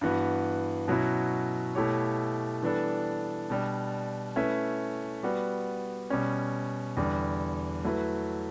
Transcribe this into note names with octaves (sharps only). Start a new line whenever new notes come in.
G2 E3 B3 F#4
B2 F#3 C#4 E4
B2 A3 E4 G4 C#5
E3 G3 B3 D4 A4
B2 G3 D4
A3 C#4 E4 B4 E5
G3 B3 F#4
B2 G3 C#4
E2 D3 G3
F#3 A3 E4 B4